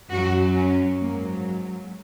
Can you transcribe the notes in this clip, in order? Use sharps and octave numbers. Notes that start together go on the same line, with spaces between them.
F#2 F#3 F#4
C#4
G#2 F#3 A#3